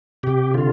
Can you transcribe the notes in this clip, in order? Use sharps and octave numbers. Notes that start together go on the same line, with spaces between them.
C3 G4
D3 F4